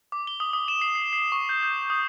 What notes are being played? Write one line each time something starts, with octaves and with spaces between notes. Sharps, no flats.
D6
G7
D#6
D#6
E7
C7
C7
C7
C#6
G6
G6
D#6